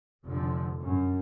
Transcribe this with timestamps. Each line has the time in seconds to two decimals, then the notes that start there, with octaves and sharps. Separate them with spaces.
0.25 F1 D3 F3
0.78 F#2